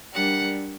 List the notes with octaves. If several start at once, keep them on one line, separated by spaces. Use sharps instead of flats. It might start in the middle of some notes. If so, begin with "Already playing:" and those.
G3 D4 G4 A#4 F#5